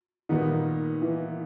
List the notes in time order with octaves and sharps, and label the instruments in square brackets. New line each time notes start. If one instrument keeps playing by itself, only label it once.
[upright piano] A#2 G3 B3 D#4 [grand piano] D#3
[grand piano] E3